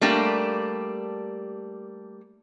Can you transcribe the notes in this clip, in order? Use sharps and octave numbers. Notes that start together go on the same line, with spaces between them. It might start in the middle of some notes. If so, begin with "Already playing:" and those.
G3 A3 A#3 D4 G4